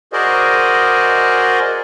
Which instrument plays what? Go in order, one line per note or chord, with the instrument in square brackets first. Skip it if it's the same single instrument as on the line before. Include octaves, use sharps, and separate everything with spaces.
[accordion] F#4 G#4 A#4 C5 D5 D#5